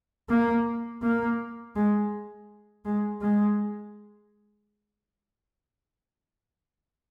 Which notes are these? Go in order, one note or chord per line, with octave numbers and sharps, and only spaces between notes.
A#3
A#3
G#3
G#3
G#3